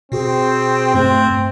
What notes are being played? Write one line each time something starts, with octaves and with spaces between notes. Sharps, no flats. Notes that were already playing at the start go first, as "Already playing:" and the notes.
B2 C4 F#4 G#4
G2 A3 C4